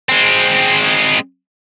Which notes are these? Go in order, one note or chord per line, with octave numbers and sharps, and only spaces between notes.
G#3 C4